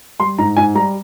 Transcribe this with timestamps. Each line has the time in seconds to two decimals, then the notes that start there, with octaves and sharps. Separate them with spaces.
0.20 G3 C6
0.38 G#2 A#5
0.57 G#2 G#5
0.75 G3 A#5